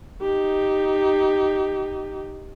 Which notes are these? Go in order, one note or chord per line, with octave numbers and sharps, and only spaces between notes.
D#4 G4